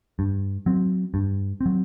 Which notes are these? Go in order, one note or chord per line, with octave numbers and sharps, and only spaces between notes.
G2
F#3 C4
G2
C4
F#3